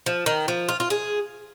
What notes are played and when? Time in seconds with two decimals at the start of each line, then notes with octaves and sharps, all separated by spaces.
0.06 F3
0.26 D#3
0.48 F3
0.69 F4
0.80 F4
0.90 G#4